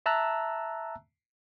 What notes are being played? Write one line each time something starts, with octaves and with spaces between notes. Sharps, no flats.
E5 A5 A#5 E6 F#6